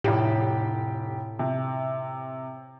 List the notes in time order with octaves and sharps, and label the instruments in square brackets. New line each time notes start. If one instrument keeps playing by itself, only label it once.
[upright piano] F1 G4 [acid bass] A2
[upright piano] C3